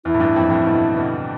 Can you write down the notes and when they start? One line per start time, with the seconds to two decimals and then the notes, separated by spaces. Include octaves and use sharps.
0.05 E2 E4
0.14 A2
0.20 E2 G2
0.36 F2
0.50 F2 A2
0.66 G2 B2
0.96 B2 D3